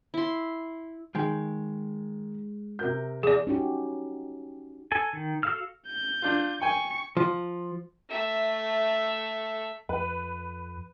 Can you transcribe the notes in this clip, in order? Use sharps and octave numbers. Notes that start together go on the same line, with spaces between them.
E4 C6
D#3 G#3 G5
C3 A#4 G6
E2 G#4 D5
C#4 D#4 F#4 G4
A4 G#5
D#3
F#4 A4 F5 E6 F6
G6
D4 F4
G5 G#5 C#6
F3
A3 E5
F2 B4